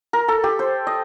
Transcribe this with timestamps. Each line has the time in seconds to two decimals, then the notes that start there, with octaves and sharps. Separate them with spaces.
0.13 A#4
0.28 A4
0.44 G4
0.59 C5
0.87 D#5